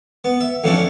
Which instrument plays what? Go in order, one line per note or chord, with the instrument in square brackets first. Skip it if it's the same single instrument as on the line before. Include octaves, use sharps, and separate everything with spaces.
[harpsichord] B3
E5
F2 A2 E3 C#4 D4